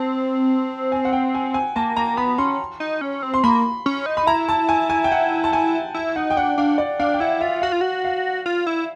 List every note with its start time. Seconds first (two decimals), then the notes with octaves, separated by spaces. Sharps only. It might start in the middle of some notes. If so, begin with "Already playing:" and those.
Already playing: C4 A5
0.92 G#5
1.05 F#5
1.13 G5
1.35 G#5
1.54 G#5
1.76 A#3 A5
1.96 A#3 A#5
2.17 B3 B5
2.38 C#4 C6
2.80 D#4
3.01 C#4
3.23 C4
3.34 C6
3.43 A#3 B5
3.86 C#4
4.06 D#4
4.17 B5
4.27 E4 A#5
4.48 A5
4.69 G#5
4.90 G#5
5.04 G5
5.12 F#5
5.44 A5
5.53 G#5
5.94 E4
6.16 D#4 F#5
6.30 G5
6.37 D4 F#5
6.58 D4 F5
6.78 D5
6.99 D4 F5
7.14 G5
7.20 E4 F#5
7.41 F4 E5
7.62 F#4 F5
7.72 F4
7.81 F#4
8.05 F5
8.46 F4
8.67 E4